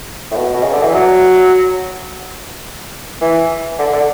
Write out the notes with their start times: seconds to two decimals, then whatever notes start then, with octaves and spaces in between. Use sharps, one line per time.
0.31 A2
0.35 B2
0.54 B2
0.63 C#3
0.73 D3
0.83 E3
0.93 F#3
3.21 E3
3.79 D3
3.93 D3